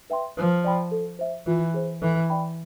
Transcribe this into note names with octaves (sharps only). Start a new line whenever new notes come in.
B4 E5 G5 C6
F3 B4
D5 G5 B5
A4
C5 E5
E3 F4
G#4 C5
E3 A4
D5 G5 B5